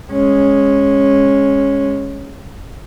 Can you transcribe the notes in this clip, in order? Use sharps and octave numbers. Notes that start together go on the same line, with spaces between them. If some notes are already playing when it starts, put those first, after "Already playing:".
G#3 C#4